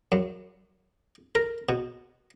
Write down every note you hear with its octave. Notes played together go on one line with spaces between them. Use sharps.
F#2
A#4
B2